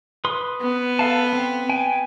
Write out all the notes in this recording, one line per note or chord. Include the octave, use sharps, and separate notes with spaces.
B4 C6 D#6
B3
A4 F5 A5
C4
G5 G#5